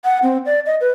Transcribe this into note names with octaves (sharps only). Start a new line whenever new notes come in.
F#5
C4
D5
D#5
B4